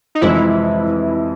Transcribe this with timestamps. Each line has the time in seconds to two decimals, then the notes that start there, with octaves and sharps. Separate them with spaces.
0.15 D#4
0.21 F2 C3 E3 G#3 E4